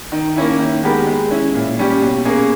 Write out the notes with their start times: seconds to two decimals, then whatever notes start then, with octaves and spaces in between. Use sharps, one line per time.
0.12 D#3
0.36 A#3 C#4 E4
0.59 D#3
0.83 G#3 B3 G4 A#4
1.07 G#3
1.31 C#4 E4
1.54 A#2
1.79 G3 C#4 G4
2.02 B2
2.25 A#3 C#4 G#4 C#5